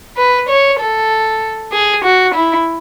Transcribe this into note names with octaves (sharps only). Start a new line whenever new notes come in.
B4
C#5
A4
G#4
F#4
E4